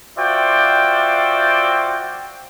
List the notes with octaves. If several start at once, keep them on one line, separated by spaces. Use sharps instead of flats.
F4 F#4 C5 D5 E5 G5